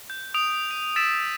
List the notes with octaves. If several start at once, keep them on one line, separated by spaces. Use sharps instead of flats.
G6
D#6 D7 F7
D#7 F7
E6 A6 B6 D7 E7